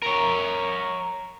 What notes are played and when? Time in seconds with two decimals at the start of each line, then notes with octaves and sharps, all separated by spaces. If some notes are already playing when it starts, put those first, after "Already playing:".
0.02 A#4 C#5